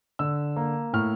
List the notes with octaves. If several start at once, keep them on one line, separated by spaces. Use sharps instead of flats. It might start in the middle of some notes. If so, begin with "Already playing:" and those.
D3 E6
A#3
A2 F6